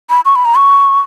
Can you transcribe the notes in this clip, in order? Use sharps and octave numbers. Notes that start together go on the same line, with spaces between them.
B5
C#6
B5
A#5
C#6